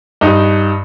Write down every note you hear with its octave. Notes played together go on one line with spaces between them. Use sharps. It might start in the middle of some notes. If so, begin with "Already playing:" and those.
G2 D#4